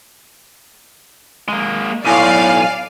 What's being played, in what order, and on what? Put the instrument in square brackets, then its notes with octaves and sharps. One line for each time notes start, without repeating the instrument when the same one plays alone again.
[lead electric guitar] G#3 A#3
[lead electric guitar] B1 [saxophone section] A2 [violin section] D5 F5 [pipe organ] G#5